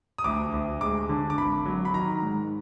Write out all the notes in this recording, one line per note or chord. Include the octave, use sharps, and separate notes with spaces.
D#6
D2 D6
D2
G#3 D6
D3
D6
G#1 B5
F#3
B5
D#3 A#5
G#2